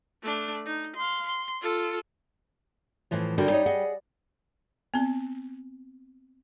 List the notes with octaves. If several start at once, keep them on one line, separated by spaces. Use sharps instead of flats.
A3 D4
D#4
F5 C6
C6
F4 A4
A2 E3 F3
D3 G3 F#4 A#4
D#4 C#5 D#5
G#4 D#5 F#5
B3 C4